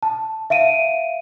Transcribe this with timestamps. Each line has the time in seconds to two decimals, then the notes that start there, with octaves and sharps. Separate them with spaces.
0.03 A5
0.50 E5 F5 D7 D#7